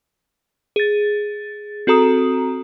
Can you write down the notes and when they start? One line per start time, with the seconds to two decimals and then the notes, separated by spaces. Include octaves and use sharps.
0.76 G#4 A6
1.87 C4 F#4 A4 A#5 D#6